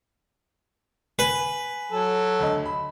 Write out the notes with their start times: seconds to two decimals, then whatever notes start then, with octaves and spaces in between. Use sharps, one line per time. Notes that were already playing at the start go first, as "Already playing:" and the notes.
1.19 B4 G#5
1.92 F#3 A4
2.40 D2 D#5
2.65 B5